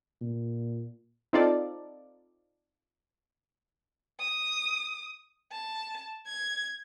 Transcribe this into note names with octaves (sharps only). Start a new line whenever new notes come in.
A#2
C4 D#4 F4 A4 D5
D#6
A5
G#6